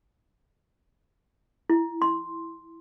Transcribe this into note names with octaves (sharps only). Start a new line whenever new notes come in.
E4
C6